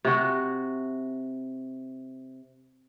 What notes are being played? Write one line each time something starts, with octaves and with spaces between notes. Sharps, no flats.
C3 F#4